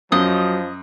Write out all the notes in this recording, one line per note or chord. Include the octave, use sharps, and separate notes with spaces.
F#2 F3 F#3 D#5